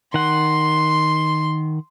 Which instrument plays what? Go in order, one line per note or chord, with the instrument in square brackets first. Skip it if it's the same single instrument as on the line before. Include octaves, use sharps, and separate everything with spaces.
[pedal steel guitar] D#3 F#5 [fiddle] C6